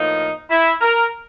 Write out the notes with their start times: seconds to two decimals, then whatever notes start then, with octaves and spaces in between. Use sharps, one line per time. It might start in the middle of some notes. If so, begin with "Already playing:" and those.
Already playing: A2 F3 A#3 D#4
0.50 E4
0.81 A#4